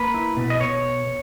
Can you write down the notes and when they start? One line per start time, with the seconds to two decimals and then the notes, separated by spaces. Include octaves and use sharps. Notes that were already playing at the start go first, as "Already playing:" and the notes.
Already playing: A#3 B4
0.14 E4
0.37 B2
0.50 D#5
0.61 B2 C#5